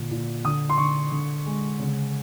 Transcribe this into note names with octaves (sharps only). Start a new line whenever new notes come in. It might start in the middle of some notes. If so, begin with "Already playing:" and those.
Already playing: A#2 D3
A#2
D3 D#6
C6
D3 C#6
D3
G#3
C#3